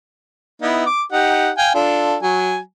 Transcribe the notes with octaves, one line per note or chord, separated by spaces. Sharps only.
B3 D#4 E4
D6
D#4 G4 F#5
F5 G5 G#5
D4 F4 A4
F#3 G#5